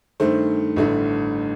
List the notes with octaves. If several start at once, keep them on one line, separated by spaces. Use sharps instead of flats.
G2 D#3 A3 C5
A1 G2 D3 A3